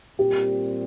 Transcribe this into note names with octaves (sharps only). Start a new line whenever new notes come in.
A#2 G3 C4 G4